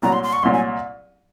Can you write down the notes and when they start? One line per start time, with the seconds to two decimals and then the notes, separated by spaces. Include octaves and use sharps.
0.02 C2 A#2 F#3 A#5
0.13 C6
0.23 C6
0.33 C#6
0.43 C2 A#2 F#3 C6
0.53 G#5